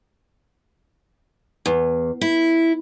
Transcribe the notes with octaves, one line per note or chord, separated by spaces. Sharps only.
E2
E4